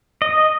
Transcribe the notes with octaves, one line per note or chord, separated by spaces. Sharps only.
D#5